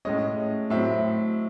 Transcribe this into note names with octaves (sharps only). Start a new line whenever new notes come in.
A2 G#3 C#4 D#5
A2 F#3 C4 E5